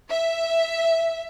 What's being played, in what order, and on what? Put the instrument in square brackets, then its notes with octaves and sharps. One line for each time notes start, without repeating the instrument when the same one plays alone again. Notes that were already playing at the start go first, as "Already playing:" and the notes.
[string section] E5